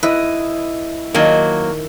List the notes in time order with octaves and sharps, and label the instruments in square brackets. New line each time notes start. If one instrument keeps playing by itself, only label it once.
[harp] E4 D#5 [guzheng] B4
[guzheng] D#3 [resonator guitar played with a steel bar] F#3 A#3